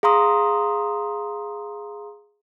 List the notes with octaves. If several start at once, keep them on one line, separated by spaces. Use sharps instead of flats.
G#4 F5 A#5 C6 D#6